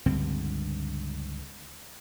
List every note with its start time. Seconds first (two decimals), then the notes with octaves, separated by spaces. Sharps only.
0.06 C#2 G2 D3 C4